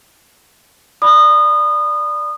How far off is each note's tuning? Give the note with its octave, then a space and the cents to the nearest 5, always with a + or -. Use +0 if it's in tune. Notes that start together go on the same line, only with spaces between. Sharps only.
D5 +0 B5 +0 D#6 -25